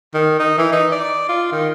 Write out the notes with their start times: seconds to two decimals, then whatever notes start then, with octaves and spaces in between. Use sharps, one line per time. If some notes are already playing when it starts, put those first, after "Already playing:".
0.14 D#3
0.40 D#4
0.58 E3
0.72 D#4
0.92 D5
1.29 F4
1.52 D#3